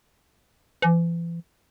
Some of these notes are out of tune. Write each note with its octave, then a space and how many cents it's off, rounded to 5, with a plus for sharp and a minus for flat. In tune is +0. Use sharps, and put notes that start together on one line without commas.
E3 +40